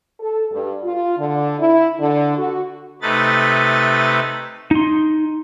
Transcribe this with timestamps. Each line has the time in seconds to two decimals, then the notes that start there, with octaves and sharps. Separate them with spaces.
0.20 A4
0.51 G2
0.83 F4
1.18 D3
1.59 E4
2.00 D3
2.37 F#4
3.02 C3 A3 D#4 B4 A6
4.71 D#4 C6